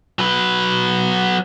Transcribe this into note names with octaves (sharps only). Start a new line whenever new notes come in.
F#3 B4